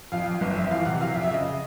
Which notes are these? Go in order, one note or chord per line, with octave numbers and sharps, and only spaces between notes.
F2 F5
F2
G1
F2 E5
E3 F5
C3 F#5
F#3 F5
E5
F2
E5
C#3 D#5